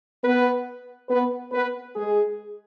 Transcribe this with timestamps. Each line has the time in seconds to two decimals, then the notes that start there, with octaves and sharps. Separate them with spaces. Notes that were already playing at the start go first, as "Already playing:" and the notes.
0.23 B3 B4
1.09 B3 B4
1.52 B3 B4
1.95 G#3 G#4